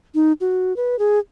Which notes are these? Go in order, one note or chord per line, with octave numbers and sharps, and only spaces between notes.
D#4
F#4
B4
G#4